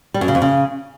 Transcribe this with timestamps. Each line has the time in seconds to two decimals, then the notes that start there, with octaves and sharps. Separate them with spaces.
0.14 G3
0.21 F#2
0.28 C#3
0.35 F2
0.42 C#3